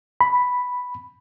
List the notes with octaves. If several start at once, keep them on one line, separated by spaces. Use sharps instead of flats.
B5